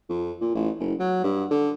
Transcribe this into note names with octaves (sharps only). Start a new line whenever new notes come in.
F2
A#2
A1
F#1
F#3
G2
D3